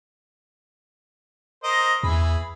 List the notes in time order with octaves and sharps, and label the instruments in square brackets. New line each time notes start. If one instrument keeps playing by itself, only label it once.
[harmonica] A#4 C5 D#5
[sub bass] E2 [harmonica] E3 G#4 B5